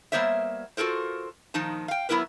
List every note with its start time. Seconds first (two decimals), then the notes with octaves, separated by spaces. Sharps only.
0.12 G3 A#3 B3 C5 C#5 E5
0.77 F4 F#4 A4 A#4 C5
1.54 A#2 D#3 F3 D#4 A5
1.88 F5 G5
2.09 F#3 B3 E4 A#4 B4